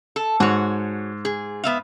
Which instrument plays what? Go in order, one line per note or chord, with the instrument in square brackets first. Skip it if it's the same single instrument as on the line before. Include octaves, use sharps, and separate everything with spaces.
[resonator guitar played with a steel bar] A4
[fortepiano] G#2 [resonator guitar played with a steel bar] F#4 C#5
[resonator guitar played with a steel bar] G#4
B3 E5 F5